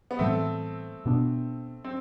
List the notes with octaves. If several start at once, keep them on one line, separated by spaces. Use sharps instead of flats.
B3
A2 E3 G3 A3 C4
B2 B3 D4
C4